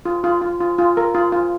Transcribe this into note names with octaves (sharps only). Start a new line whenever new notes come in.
F4
F4
F4
F4
F4
A#4
F4
F4